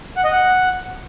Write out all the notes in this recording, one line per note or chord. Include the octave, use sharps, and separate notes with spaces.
F#5
D#5
F#5